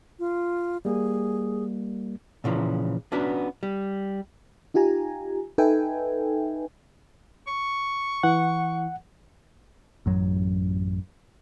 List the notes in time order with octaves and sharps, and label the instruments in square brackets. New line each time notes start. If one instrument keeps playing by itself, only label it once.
[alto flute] F4
[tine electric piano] G3 A#3 [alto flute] G#4
[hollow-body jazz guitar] A#2 C#3 E3 F3
B3 C#4 D4 F#4 B4
G3
[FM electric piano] D#4 F4 G4 G#5 A#5
D#4 A4 B4 E5 G5 G#5
[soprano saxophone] C#6
[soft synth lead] E3 [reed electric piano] F#5
[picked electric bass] A1 F#2 F#3